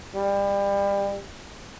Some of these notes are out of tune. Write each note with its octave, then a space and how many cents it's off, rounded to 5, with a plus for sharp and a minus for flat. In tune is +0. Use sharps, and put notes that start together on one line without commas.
G3 +30